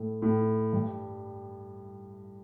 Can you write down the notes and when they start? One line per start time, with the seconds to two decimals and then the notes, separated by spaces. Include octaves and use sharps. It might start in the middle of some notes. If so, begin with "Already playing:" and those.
Already playing: A2 A3
0.22 A2 A3
0.73 G2 G3